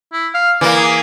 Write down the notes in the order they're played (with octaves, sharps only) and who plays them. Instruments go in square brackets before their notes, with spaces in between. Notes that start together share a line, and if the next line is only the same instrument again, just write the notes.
[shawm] E4
F5
[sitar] E3 A#3 [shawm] D5
[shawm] G#4